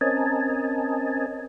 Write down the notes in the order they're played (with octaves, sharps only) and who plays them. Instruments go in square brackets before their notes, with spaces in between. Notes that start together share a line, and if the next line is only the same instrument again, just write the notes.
[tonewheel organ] C4 C#4 A#4 D#5 G#5 A5